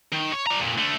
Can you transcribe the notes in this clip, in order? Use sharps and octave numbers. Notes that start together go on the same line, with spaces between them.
D#3
C#5
D4 A#5
F2 A#2
D3 A3